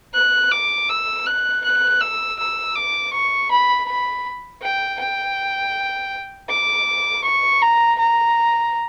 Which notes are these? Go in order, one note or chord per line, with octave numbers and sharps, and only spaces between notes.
F#6
D6
E6
F#6
F#6
E6
E6
D6
C#6
B5
B5
G5
G5
D6
C#6
A#5
A#5